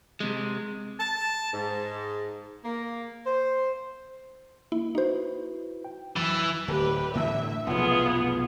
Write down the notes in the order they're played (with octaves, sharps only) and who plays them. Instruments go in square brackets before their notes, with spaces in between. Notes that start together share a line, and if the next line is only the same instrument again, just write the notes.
[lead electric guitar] C3 G#3
[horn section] A5
G#2
A#3
C5
[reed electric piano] A#3 [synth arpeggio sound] E4
[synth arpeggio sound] D#4 C5 [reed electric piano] E4 F#4 B4
[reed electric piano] G5
[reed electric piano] F2 F#3 A6 [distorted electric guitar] E3
[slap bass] D1 [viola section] G4 B4
[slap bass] A2 D3 E3 [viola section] E5
[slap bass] F1 B1 [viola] B3 G#4 [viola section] F4